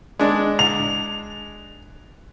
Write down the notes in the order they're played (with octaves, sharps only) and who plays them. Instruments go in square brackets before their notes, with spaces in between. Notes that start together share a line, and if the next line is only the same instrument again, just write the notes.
[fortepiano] G#3 D4
[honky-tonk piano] F7